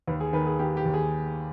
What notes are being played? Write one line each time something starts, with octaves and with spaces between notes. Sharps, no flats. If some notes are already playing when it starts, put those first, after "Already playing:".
D#2 B4
G#4
D#3 B4
G#4
D#3 G4
G4
D#2
G#4